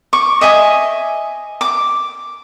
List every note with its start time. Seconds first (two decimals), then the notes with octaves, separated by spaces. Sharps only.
0.13 C#6 D6
0.41 D#5 E5 G#5
1.61 D6